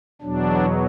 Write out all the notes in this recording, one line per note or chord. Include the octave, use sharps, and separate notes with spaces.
E2 B2 F#3 D4